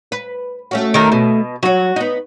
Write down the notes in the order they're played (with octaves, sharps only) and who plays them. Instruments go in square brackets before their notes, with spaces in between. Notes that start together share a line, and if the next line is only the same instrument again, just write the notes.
[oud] B4
A3 C#4 F#4
[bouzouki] D#3 A4 A#4
B2
[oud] F#3 C#5 [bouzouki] F#4
[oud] B3 D#4